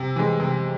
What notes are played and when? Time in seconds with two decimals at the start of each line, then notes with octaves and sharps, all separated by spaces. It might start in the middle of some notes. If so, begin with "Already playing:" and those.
Already playing: C3
0.16 E3 G#3
0.40 C3